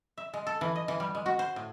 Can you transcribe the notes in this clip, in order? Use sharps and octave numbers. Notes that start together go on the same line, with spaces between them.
E5
G#3
A4
E3
D#5
E3
G3
G#3
F#4
C5
A2